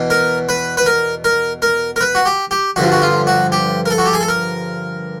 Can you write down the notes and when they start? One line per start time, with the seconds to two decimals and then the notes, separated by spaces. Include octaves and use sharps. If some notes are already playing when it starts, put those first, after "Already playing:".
Already playing: E2 B2
0.10 A#4
0.49 B4
0.77 B4
0.86 A#4
1.24 A#4
1.62 A#4
1.96 A#4
2.01 B4
2.15 F#4
2.26 G4
2.51 G4
2.76 G2 D3 F3 F#4
2.92 F#4
3.02 F4
3.27 F#4
3.52 G4
3.86 A#4
3.90 A4
3.98 F#4
4.06 G4
4.13 G#4
4.21 A4
4.28 A#4